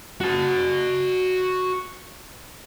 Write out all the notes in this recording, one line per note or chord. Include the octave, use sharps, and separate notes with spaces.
F#4 A5